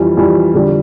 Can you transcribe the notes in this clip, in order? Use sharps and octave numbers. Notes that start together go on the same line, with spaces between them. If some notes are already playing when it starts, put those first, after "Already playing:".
Already playing: F2 E3 G3
F2 E3 G3
F2 D3 G3